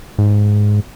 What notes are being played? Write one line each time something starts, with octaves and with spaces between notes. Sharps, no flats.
G#2